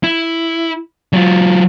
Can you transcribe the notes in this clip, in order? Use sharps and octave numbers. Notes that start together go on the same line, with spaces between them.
E4
F#3 F4